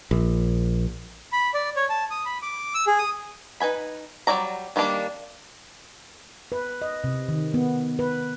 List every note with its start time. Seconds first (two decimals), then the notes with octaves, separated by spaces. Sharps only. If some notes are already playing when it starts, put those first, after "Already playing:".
0.11 A#1
1.32 B5
1.54 D5
1.76 C#5
1.89 A5
2.11 D#6
2.26 B5
2.42 D6
2.74 E6
2.87 G#4
2.99 D#6
3.60 D#4 B4 G#5 B5
4.27 F#3 G3 F#4 D5 A#5
4.76 D#3 G3 A#3 D4 D5
6.52 B4
6.82 D#5
7.04 C3
7.29 D#3
7.54 B3
7.99 B4